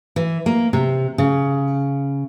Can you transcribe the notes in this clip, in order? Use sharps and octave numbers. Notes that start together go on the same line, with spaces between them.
E3
A#3
C3
C#3